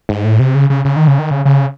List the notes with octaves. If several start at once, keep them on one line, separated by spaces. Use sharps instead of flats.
G#2
A2
C3
C#3
C#3
C#3
D#3
C#3
D#3
C#3
C#3